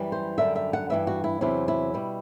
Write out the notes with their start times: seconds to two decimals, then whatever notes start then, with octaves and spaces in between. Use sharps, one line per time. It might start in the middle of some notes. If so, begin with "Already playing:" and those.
Already playing: F#2 E3 G3
0.12 C5
0.38 F#2 D3 G3 E5
0.56 E5
0.73 F#5
0.90 G2 E3 G3 E5
1.07 F#4
1.24 E4
1.41 E2 C3 F#3 E4
1.68 E4
1.94 B2 G3